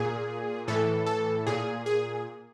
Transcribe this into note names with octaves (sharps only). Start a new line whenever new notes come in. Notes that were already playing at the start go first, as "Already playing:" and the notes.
Already playing: A#2 G#4
A2 E3 A4
A4
A#2 G#4
G#4